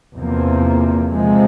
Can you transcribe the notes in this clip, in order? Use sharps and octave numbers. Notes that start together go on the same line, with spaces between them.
E2 C3 F3 A#3
C3 F3 G#3